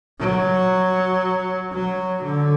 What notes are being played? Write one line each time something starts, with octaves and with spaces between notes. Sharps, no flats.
F#3
F#3
D3